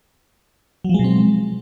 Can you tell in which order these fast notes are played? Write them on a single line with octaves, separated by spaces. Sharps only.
F#3 F3 G#3 B2 C4